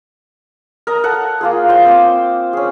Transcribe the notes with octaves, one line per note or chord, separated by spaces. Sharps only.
A#4 D#5 A#5
A4 F#5
A#3 F4 G#4
F4 C5 G5
C4 C5 D6
C#4 G#4